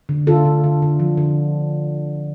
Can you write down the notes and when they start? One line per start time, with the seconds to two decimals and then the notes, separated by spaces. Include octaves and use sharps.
0.09 D3
0.27 D3 F4 A4
0.45 D3
0.64 D3
0.82 D3
1.00 F3
1.18 D3